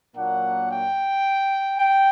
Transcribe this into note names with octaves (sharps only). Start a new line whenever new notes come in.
A#2 F#3 A#3 D4 F#5
G5
G5